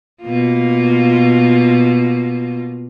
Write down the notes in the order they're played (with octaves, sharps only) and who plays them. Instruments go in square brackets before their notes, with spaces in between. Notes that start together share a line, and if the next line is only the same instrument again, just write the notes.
[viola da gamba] B2 A#3 F4